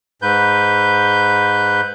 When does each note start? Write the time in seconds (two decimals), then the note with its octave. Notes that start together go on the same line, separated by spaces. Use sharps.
0.22 G#2 B4 G6